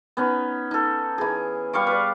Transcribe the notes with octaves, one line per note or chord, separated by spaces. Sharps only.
B3 C#4 D#4
D#4 A4
E3 G#4
G3 F5 C#6 D6
B4 D5